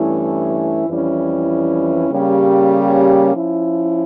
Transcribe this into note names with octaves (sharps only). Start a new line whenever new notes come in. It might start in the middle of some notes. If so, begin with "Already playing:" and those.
Already playing: G2 E3 A3 C#4 E4
F2 E3 G3 C#4 E4
C#3 G3 A#3 C#4 G4
F3 C#4 E4